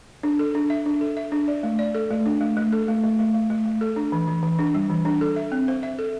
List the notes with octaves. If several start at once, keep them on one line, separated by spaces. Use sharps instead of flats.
D4
A4
D4
E5
D4
A4
E5
D4
D5
A3
D5
A4
A3
D4
A3
A3
A4
A3
A3
A3
A3
A3
A3
A4
D4
E3
E3
E3
D4
G3
E3
D4
A4
E5
C4
C5
E5
A4